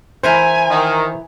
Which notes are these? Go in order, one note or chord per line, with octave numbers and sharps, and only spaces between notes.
E3 E4 A#4 C5 G#5
D#3